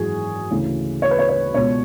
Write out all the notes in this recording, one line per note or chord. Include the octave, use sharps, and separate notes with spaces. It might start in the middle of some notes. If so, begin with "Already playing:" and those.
Already playing: G#1 F#2 E3 F#4 G#4
D2 C#3 E3
C#5
B4
C#5
C#5
C#2 B2 C#5